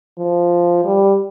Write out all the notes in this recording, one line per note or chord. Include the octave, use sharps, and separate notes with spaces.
F3
G3